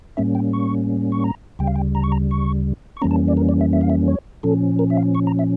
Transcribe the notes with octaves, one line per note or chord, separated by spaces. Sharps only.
A2 G3 A#3 C#4 E5
G5
C#6
C#6
A#5
D2 C#3 G3 G5
F5
G5
A#5
C#6
A#5
C#6
C#6
F2 E3 G3 A#3 C#4 A#5
A5
D5
A#4
D5
E5
E5
F5
E5
C#5
A#2 F3 C#4 A4
A#4
E5
F5
C#6
A#5
E5